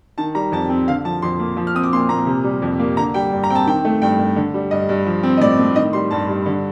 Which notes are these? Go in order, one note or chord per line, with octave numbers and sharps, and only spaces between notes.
D#3 A5
G3 A#5
F2 A5
C4
D3 F5
F3 A5
F2 C6
A#3
F3
F6
C4 D#6
D6
A#2 C6
A#2 A#5
C3
G3
F2
A#3
D3 A#5
G3 G5
G2
A#5
C4 G5
A5
D#3 G5
A3
G2 G5
G2
D3
G3
G2 D#5
G2
F3
C4
D#5
A2 D5
A2
D#3 D#5
G3 C6
G2 A5
G2
D3